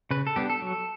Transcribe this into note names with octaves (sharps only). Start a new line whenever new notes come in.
C#3 B4
A4
G3 B3 D4 G4
A4
F#3